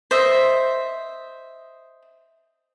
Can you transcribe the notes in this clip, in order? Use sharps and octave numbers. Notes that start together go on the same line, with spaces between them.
C5 D#5 E5